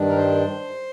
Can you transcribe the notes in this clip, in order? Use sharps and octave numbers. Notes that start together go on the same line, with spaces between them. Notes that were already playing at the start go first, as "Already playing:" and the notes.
Already playing: G2 D#3 G3 D4
A#4
C5